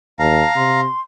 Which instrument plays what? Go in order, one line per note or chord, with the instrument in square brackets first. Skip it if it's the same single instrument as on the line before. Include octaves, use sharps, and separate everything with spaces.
[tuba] D#2 [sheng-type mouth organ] F5 A#5 [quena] A5
[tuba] C3 [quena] C6